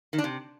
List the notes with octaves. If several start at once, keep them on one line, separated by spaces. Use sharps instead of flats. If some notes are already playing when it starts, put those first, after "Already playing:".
D#3
D4
C3